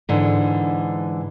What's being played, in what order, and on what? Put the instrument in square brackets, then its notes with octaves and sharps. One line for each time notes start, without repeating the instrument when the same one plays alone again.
[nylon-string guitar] G#2 D3 E3